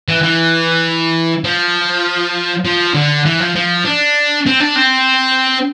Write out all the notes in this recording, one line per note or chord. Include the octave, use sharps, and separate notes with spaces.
E3
E3
F3
F3
D3
E3
F3
F3
D4
C4
D4
C4